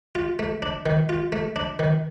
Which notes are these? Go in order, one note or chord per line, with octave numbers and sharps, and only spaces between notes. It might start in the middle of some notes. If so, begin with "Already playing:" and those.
F4
A3
D4
D#3
F4
A3
D4
D#3